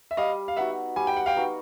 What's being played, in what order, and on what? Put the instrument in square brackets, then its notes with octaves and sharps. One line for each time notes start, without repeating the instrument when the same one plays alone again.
[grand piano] E5
[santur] G3 [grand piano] D#5 F5
[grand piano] F5
[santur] B3 D#4 F#4 [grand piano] E5 F#5
[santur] G3 [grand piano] G#5
[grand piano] G5
F#5
F5 G5
[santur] B3 D#4 F#4